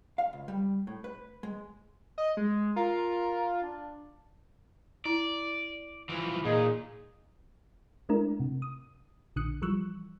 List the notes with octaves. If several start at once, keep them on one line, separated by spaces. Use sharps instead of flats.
F5
C#2
G3
A2
B4
G#3
D#5
G#3
F4 A#4
D4
E4 D5
E3 F3
A#2 D#4 G#4
G#3 A3 D4 E4 A#4
C3
D#6
A#1 D3 D#6 F#6 C#7
E3 F3 G3 C#6 E6 F#6